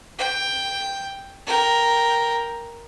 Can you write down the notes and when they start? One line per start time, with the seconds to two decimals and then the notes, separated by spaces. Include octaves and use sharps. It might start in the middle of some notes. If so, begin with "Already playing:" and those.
0.18 G5
1.47 A#4 G5